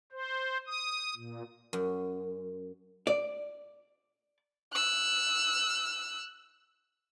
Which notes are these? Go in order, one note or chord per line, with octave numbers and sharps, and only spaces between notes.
C5
D#6
A#2
F#2
D5
E6 F#6